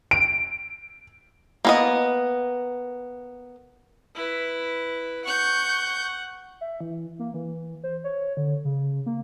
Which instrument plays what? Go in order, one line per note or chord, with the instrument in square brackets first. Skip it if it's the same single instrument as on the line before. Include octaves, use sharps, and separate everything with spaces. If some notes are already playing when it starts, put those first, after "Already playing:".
[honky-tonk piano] D7
[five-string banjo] A#3 B3 D#5
[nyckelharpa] E4 B4
[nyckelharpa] F#5 [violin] C#6 G6
[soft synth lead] E5
E3
A#3
E3
C5
C#5
D3
C#3
A#3